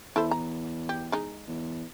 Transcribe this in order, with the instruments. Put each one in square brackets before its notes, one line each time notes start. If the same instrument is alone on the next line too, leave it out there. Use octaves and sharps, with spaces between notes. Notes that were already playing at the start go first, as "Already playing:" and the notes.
[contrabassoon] E2 [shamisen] E4 A4 C5
[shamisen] A#5
G4
G#3 D#4
[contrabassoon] E2